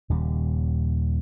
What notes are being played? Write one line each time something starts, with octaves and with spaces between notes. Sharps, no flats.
D#1 D#2 C#3 G3